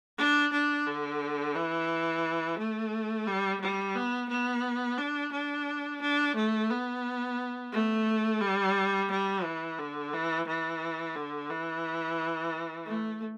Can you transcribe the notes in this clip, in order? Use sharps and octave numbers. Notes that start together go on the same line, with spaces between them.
D4
D4
D3
E3
A3
G3
G3
B3
B3
D4
D4
D4
A3
B3
A3
G3
G3
E3
D3
E3
E3
D3
E3
A3